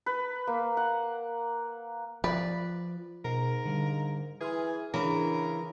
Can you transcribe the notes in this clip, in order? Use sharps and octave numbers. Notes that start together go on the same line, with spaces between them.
B4
A#3
F#5
F3 B4 D5
G#2 B2 A#4
D3 G3 F5
E3 G#4 C6 F6 G#6
C#3 E3 D4 G#4 A#4